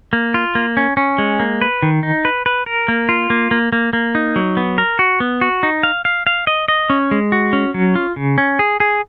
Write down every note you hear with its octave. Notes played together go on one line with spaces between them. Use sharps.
A#3
F4
A#3
C#4
C#4
G#3
A#3
B4
D#3
D#4
B4
B4
A#4
A#3
F4
A#3
A#3
A#3
A#3
D#4
F#3
B3
A#4
F#4
B3
F#4
D#4
F5
F5
F5
D#5
D#5
C#4
G#3
F#4
C#4
F#3
F4
C#3
C#4
G#4
G#4